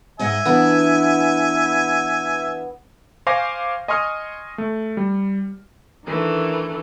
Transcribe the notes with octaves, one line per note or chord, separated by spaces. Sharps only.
G#2 D#5 E5 F#5 G#5
E3 B3 D4 E4
C5 F5 G#5 C#6 D6 A#6
D#5 G#5 C6 C#6 D#6 F6
A3
G3
D#3 E3 A3 D4